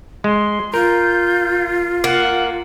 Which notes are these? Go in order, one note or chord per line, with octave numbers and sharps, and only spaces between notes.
G#3 C6
F4 A#4 G6
A#3 F#5